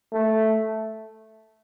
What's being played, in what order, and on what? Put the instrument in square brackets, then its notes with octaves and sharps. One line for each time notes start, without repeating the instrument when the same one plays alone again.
[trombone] A3